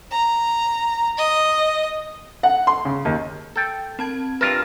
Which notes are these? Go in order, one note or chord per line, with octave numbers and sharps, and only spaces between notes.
A#5
D#5
F#5
C6
C#3
D#2
A4 G5
C4 A5 G#6
G2 F4 A#4 B4 E5 F6